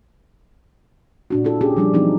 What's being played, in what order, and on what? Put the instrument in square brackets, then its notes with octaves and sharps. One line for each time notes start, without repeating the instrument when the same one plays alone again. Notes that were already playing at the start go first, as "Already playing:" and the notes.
[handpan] A#2 D4 F#4
E4 F4 A4
C#4 G4 G#4
F3 G3 D4
E3 F#3 C4 D#4